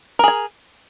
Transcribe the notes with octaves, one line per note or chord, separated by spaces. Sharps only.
G#4 A#4 G#5